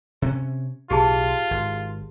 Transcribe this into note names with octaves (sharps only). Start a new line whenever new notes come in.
C3 C4 C#4
B1 A2 F4 G4 G#4 A5
G#1